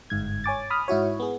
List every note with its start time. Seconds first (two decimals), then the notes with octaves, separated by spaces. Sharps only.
0.10 G1 G#2 G#6
0.44 C#5 G#5 D6 A6
0.70 B5 D#6 F6
0.88 G#2 E4 F#4 C#5
1.20 B3 G#4